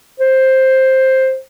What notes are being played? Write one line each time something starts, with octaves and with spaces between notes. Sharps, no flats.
C5